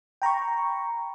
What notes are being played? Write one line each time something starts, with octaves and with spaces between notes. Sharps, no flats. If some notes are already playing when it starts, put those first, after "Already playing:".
G5 A#5 B5 C#6